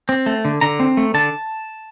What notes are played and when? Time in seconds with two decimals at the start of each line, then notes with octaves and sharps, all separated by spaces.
0.09 C4
0.26 A3
0.45 D3
0.61 D3 A#5
0.80 C4
0.97 A3
1.14 D3 A5